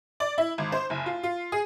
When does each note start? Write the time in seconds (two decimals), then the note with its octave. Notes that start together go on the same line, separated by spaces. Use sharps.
0.20 D5
0.38 E4
0.58 G#1
0.72 C5
0.90 F#1
1.06 F4
1.23 F4
1.52 G#4